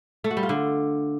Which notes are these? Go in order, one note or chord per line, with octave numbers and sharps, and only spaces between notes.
A3
F#4
G3
F4
D3